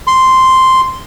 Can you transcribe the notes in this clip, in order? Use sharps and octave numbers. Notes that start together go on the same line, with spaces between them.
C6